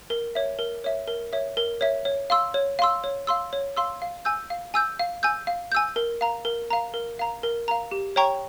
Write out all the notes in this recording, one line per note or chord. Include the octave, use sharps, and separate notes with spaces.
A#4
C#5 E5
A#4
C#5 E5
A#4
C#5 E5
A#4
C#5 E5
C#5
F5 C6 E6
C#5
F5 C6 E6
C#5
F5 C6 E6
C#5
F5 C6 E6
F5
G#5 E6 G6
F5
G#5 E6 G6
F5
G#5 E6 G6
F5
G#5 E6 G6
A#4
F5 A#5
A#4
F5 A#5
A#4
F5 A#5
A#4
F5 A#5
G4
C#5 G5 A#5 C#6